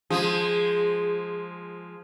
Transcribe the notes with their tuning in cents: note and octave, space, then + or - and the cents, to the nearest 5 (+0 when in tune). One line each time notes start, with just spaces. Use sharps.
F3 +0 G#3 +0 G#4 -15